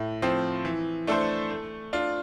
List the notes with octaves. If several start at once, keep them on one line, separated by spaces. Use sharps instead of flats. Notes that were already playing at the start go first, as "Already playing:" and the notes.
Already playing: A2
F3 C4
E3
A3 D4 A4 C5
A3
D4 F4